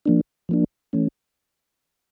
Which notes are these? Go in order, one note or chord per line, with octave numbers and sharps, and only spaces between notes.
F3 A#3 D4
F3 A#3 D4
E3 A3 C#4